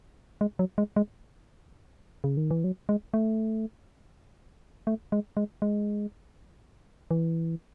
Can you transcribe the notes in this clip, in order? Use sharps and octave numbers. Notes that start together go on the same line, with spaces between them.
G#3
F#3
G#3
G#3
C#3
D#3
E3
F#3
G#3
A3
A3
G#3
G#3
G#3
E3